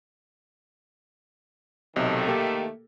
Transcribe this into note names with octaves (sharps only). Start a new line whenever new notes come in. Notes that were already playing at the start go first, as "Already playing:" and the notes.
B1 C3 D#3 A3 D#5
A#3 G4 A4